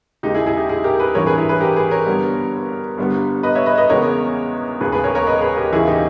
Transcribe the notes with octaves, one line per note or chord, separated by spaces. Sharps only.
D#2 C#3 G#3 D#4 G4
E4 G#4
E4 G#4
D#4 G4
E4 G#4
G4 A#4
G#4 B4
G#1 G2 E3 G3 A#4 C#5
G#4 B4
E4 G#4
G#4 B4
G4 A#4
G#4 B4
A#4 C#5
G1 G2 G3 B3
G1 G2 G3 B3
B4 D#5
C#5 E5
B4 D#5
B4 D#5
E2 C#3 G#3 B3 A#4 C#5
E1 D#2 C#3 G#4 B4
G#4 B4
A#4 C#5
A#4 C#5
B4 D#5
G#4 B4
G4 A#4
E1 D#2 C#3 E3 A#3 E4 G#4
D#4 G4